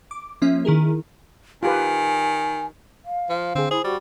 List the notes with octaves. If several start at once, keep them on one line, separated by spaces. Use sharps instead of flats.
D6
F3 A#3 C#4 E5
D#3 E4 G#4 A#4
D#3 F4 G4 B4 G#5
F5
F3
D3 C4 G#4
E4 G#4 C5
G3 F#4